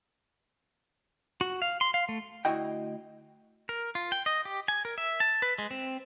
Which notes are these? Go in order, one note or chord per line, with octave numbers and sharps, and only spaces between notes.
F#4
F5
C6
F5
A3
D2 C#3 E4 F#4 D#5 G5
A#4
F4
G5
D#5
G4
G#5
A#4
E5
A5
B4
G#3
C4